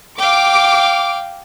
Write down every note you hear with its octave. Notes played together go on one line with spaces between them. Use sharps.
F5 G5 D6